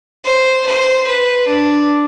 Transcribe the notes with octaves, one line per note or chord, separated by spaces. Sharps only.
C5
C5
B4
D4